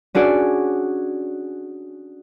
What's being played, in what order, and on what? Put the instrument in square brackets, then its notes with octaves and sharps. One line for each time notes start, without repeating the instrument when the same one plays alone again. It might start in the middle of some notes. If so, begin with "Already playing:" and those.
[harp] C#4 D4 F#4 G#4 D5